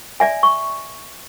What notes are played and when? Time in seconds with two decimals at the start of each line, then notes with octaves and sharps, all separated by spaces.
0.20 D5 E5 G#5
0.43 C#6